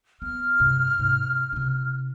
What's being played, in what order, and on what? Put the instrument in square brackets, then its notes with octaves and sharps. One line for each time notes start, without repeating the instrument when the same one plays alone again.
[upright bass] B3 [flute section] F6
[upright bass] G2 C3
G#2 C3
C3 D#4